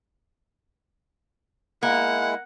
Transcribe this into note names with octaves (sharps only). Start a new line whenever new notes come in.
G#3 A#3 E4 F#5